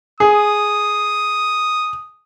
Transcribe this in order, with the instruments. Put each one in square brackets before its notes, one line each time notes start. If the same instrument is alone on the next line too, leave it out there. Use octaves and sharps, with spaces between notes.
[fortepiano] G#4 [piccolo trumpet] D#6